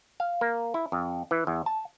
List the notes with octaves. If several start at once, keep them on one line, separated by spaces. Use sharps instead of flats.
F5
A#3
E4
F2
E3
E2
A5